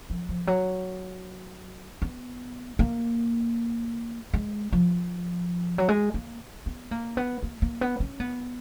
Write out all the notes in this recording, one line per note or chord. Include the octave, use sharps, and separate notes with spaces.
F3
F3
F#3
B3
A#3
G#3
F3
F#3
G#3
A#3
B3
A#3
B3
A#3
A#3
B3
C#4
B3